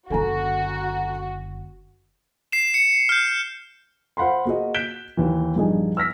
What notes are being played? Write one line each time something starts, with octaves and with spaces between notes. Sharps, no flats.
F#1 D3 F#4 A4 G#5 A#5
C7 E7
C#7
F6 G6
C5 F5 F#5 B5 C6
A#3 F#4 G#4 D#5
F#6 G6 B6 D7 E7 G7
D#2 E3
A#1 G2 D#4 G#4 D#5 G#5
E6 F6 A#6 B6